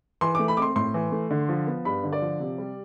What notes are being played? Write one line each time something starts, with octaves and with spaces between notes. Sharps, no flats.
E3 C6
D6
A3
B5
C4 C6 D6
A2 C6
E3
A3
D3
F3
B3
G2 B5
D3
D5
F3
C3
G3